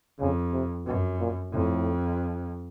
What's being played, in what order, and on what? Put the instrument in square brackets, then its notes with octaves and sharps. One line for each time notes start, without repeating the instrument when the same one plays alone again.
[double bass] F2 [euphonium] C#3
[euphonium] C3
[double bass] F#2 [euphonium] B2
[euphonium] A#2
[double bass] F2 [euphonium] A2